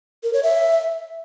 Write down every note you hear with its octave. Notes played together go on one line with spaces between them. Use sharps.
A#4
C#5
E5